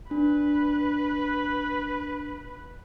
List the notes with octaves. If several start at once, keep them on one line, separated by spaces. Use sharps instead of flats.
D4 B4